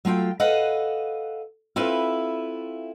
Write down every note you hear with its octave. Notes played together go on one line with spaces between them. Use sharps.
F#3 A3 F4 G5
A4 B4 D#5 F5 F#5
C4 E4 F4 A4 B4 E5